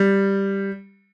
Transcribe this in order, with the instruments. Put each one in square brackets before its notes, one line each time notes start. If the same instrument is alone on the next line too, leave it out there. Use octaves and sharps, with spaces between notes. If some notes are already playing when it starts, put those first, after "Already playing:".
Already playing: [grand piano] G3